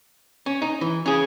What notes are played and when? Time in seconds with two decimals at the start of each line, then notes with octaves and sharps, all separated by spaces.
0.46 C#4
0.62 D#4
0.81 E3
1.06 C#4 G#4